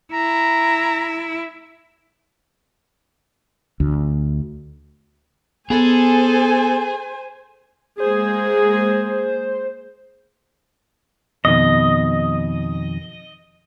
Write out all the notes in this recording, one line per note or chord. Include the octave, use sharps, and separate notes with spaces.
E4 A#5
D2
B3 G#4 A4 C5 G#5
G#3 A#3 G#4 C5
F2 B2 D#3 D#5